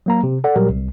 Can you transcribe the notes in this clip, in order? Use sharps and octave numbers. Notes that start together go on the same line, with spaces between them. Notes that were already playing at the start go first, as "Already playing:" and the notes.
F#3 A#3 A#5
C3
A4 D5 F#5
A#2 F#3 G3 G4 A#4
C2